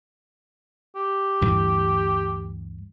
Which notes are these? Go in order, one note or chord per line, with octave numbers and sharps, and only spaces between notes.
G4
D2 G2 E3